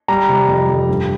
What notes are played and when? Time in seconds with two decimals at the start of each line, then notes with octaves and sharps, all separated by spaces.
0.08 G3 A#5
0.29 C3
0.48 F2
0.69 F2
0.89 G2